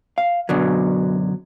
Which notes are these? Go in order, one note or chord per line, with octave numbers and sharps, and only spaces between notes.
F5
F#2 B2 D3 F#3